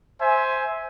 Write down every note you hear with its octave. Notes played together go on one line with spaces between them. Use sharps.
C5 E5 G#5